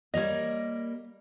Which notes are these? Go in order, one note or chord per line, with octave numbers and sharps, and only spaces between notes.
G3 A#3 A#4 C#5 D#5